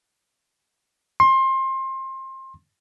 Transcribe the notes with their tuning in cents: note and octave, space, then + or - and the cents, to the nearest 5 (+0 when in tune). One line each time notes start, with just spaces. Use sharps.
C6 +25